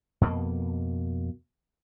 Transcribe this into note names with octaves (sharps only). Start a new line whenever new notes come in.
F2 B2 A#3